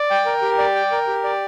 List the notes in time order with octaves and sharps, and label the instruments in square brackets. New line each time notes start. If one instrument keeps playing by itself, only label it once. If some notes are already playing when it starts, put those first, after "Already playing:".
Already playing: [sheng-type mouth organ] D5
G5
A#4
G4
D5
G5
A#4
G4
D5